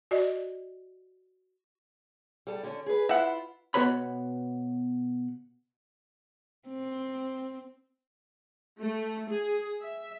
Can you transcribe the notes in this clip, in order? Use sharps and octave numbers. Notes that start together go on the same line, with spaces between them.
F#4 D5 D#5
G3 A4
D3 C#4
G#4 B4
E4 F4 E5 F#5
B2 B3 F#4 B4 C#5 B5
C4
A3
G#4
E5